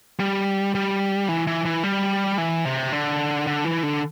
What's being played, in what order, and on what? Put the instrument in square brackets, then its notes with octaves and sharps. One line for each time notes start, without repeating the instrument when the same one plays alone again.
[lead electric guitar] G3
G3
E3
E3
E3
G3
E3
C3
D3
D3
E3
D3